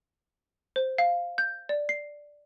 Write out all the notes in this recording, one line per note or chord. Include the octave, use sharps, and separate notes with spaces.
C5
F5
G6
D5
C7